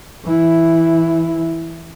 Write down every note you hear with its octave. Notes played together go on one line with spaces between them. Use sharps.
E3 E4